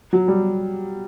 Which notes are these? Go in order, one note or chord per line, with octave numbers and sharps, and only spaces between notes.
F#3
G3